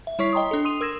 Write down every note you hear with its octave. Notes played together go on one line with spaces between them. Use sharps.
E5
G3 E4 C#5 C#6 B6 C7
D#5 G5 A#5 C6 D#6
D4 A4
C6 D#6 C7 D#7 F7
A#4 E6 G#6 A#6 E7